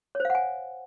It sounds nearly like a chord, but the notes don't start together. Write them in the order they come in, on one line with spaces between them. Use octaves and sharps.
C#5 C5 F5 F#5 G#5